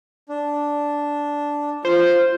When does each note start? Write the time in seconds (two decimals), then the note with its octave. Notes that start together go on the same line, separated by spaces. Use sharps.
0.29 D4
1.85 F4 C5